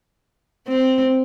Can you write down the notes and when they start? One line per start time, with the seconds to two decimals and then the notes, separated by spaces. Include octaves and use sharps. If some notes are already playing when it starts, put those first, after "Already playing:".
0.68 C4